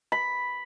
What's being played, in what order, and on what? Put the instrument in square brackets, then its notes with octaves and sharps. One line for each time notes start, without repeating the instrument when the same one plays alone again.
[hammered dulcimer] B5